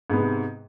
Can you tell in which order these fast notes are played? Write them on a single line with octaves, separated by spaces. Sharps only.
G#2 B3 G#3 C3